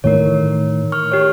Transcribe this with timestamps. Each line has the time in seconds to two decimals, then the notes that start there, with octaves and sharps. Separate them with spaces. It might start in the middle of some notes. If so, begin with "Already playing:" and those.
0.04 A2 D#3 E3 A#4 C#5
0.92 C#6 F6
1.12 G4 C#5